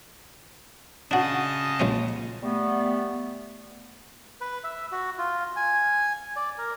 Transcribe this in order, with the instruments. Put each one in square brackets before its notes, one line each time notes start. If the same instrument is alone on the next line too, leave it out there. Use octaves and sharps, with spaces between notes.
[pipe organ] C#3 D#5 A5 [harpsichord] D4 F#4
[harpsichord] A#1 G#3 C#4
[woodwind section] G3 A3 B3
[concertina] B4
E5
F#4
F4
G#5
D5
A#4